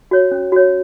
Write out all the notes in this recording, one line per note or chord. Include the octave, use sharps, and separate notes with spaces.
F#4 C#5
C#4
F#4 C#5